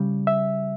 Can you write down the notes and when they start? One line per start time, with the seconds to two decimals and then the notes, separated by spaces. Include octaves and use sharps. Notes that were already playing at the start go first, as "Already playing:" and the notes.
Already playing: C#3 G3
0.27 E5